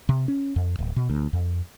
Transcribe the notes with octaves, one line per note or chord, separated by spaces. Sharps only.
C3
C#4
F2
D1
B2
D2
F2